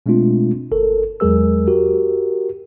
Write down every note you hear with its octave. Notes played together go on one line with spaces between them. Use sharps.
B2 G#3 A3 C4 D4 F4
G1 A4 A#4
E2 F#3 G#3 G#4 A#4 E6
F#4 G4 A#4